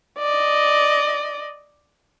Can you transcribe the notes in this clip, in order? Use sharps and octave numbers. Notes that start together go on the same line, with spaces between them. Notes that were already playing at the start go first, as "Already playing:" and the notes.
D5 D#5